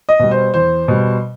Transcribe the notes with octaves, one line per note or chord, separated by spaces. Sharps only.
D#5
B2 G3
C5
E2 C5
B2 G3